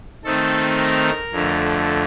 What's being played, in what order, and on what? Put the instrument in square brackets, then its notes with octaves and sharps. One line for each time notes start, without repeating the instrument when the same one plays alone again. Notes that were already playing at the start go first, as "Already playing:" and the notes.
[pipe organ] D#3 A3 C4 D#4 A4
A#4
F2 D3 A3